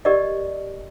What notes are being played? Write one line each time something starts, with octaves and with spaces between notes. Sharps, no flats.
G4 A#4 D5 D#5